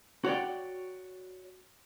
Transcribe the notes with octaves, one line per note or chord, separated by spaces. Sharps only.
F#4 C#5 D5 G5